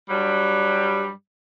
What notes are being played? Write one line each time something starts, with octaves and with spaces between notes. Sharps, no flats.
G2 F#3 G3